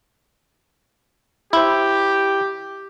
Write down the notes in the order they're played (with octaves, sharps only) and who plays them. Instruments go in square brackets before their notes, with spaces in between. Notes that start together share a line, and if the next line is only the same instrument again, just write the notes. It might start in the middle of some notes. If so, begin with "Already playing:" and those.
[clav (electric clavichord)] E4 C5 [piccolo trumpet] G4